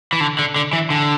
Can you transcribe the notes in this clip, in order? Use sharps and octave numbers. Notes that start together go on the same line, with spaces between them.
E3
D3
D3
D3
E3
D3